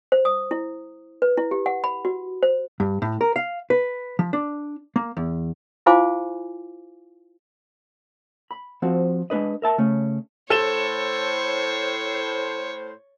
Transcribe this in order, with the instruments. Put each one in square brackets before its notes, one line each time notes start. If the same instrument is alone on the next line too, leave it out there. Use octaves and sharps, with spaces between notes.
[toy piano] C5
D#6
E4
B4
E4
G4
F#5
B5
F#4
C5
[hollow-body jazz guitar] G2
A2
A#4
F5
B4
F3
D4
A#3
E2
[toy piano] E4 F4 C5 F5 G#5 D6
[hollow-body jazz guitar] B5
F3 C4 F#4
G#3 D4 B4 D#5
A#4 E5 A5
C#3 A3 C#4
[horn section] A2 C5 [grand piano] A4 E7 G7 [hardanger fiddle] C#5